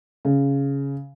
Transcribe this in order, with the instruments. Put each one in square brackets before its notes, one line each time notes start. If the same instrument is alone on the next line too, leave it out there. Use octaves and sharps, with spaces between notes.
[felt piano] C#3